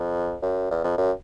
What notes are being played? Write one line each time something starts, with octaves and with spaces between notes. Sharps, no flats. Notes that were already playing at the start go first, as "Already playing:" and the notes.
Already playing: F2
F#2
E2
F2
F#2